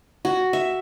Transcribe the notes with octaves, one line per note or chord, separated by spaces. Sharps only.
F#4
E5